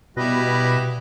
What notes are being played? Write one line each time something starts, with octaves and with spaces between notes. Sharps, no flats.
B2 G3 E4 B4 D#5